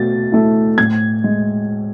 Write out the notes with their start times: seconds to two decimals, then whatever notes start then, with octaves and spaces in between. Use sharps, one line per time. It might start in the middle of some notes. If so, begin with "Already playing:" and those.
Already playing: B2 A3 A6
0.32 A3 E4
0.78 A2 G#6
1.24 G#3